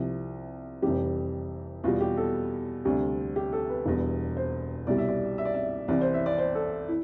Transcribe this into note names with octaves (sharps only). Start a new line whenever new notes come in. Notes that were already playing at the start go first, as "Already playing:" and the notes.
Already playing: C2 C3 F3
F1 F2 E3 G3 G4
E2 B2 G3 F4
G4
A4
D2 C3 G3
G4
A4
B4
E1 E2 B2 G3
C5
C2 B2 G3 D5
E5
D5
E5
D5
E5
C2 C3 E3 D5
C5
E5
D5
C5
A4
E4